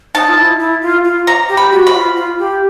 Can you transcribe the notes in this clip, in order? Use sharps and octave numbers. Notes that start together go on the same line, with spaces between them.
D#4 A5
F4
E4
E4
F4
F4
A#5
G4
B5
F#4
B5
F4
F4
G4